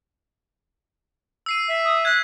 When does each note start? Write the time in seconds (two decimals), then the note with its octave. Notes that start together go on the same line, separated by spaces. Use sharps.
1.46 E6 C7 D#7
1.69 E5
1.85 D#6
2.05 F#6 G#6 B6